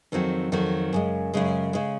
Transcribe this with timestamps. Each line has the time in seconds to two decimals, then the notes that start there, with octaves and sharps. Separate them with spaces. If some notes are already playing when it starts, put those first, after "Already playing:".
0.12 F2 D#3 F#3 C4 F#4
0.52 F2 D#3 F#3 C4 F#4
0.93 F#2 C#3 G#3
1.34 F#2 C#3 G#3
1.73 C#3 G#3